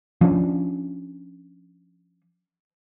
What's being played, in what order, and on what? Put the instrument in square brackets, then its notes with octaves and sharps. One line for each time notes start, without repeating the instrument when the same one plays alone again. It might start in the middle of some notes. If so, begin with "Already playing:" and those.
[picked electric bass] F3 C#4 D4